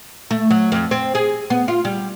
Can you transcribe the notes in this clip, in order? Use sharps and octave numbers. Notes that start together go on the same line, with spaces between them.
A3
F#3
F2
C4
G#4
B3
F4
G3